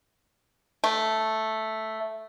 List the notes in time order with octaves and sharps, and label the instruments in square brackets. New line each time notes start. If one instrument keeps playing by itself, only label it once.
[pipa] A3